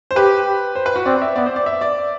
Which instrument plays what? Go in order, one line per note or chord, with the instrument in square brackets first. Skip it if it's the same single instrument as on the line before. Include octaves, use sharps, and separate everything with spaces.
[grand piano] C5
[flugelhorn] G4 [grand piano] B4
[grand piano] C5
B4
F#4
[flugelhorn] C4 [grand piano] D5
[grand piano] E5
[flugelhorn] B3 [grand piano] D5
[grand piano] C5
D5
E5
D5